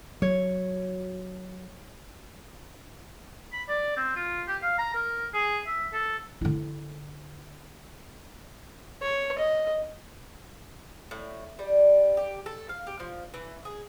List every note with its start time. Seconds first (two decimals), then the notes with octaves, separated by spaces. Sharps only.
0.22 F#3 C#5
3.53 B5
3.68 D5
3.96 C4
4.16 F4
4.48 G4
4.62 F5
4.78 A#5
4.94 A#4
5.34 G#4
5.66 E5
5.93 A4
6.41 D3 E4
9.02 C#5
9.38 D#5
11.11 A2
11.59 G3
12.17 G4
12.46 A4
12.69 F5
12.87 G4
13.00 F3
13.34 E3
13.65 G#4